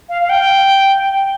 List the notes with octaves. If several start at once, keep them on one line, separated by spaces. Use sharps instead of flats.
F5
F5
G5